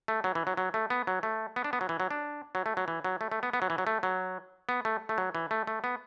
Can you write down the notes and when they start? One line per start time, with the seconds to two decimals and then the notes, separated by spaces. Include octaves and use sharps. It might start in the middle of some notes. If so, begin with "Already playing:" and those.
0.08 A3
0.24 F#3
0.35 E3
0.47 F#3
0.57 F#3
0.74 A3
0.90 B3
1.07 F#3
1.23 A3
1.56 B3
1.64 D4
1.73 B3
1.81 F#3
1.89 E3
2.00 F#3
2.11 D4
2.55 F#3
2.66 A3
2.77 F#3
2.88 E3
3.05 F#3
3.21 A3
3.32 A3
3.43 B3
3.53 B3
3.62 F#3
3.70 E3
3.78 F#3
3.87 A3
4.03 F#3
4.69 B3
4.85 A3
5.09 A3
5.18 F#3
5.35 E3
5.51 A3
5.67 A3
5.84 B3